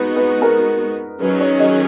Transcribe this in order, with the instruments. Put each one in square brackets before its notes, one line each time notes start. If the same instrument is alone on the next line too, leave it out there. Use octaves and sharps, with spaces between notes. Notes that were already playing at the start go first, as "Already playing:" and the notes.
Already playing: [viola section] G#3 B3 D#4 F#4 [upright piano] B4
[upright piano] B4
A#4
[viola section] D#3 F#3 C#4 G#4 [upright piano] B4
[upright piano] C#5
D#5